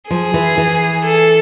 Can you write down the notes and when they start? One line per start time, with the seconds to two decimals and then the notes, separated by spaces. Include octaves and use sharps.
0.11 F3 G#4
0.34 E3
0.58 E3
1.04 A4